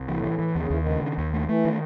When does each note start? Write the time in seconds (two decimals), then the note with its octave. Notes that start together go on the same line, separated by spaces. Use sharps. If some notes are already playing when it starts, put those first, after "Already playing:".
Already playing: C2
0.08 A2 E3
0.24 E3
0.39 E3
0.55 D#2 C#3
0.68 D#2 E3
0.78 D#3
0.86 C#3
1.02 D#3
1.18 D#2
1.33 A3
1.48 E3 A3
1.65 D#3